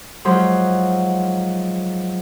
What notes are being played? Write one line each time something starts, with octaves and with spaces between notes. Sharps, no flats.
G#2 F3 F#3 C6